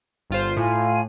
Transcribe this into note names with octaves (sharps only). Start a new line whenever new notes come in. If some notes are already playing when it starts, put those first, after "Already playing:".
G1 F4 C5
A2 F4 F5 G#5